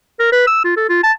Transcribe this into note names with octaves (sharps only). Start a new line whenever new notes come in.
A#4
B4
E6
F4
A4
F4
A5